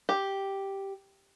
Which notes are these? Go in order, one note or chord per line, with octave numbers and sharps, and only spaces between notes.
G4